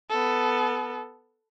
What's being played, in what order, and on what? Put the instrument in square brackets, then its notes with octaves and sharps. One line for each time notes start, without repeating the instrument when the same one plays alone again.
[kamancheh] B3 A4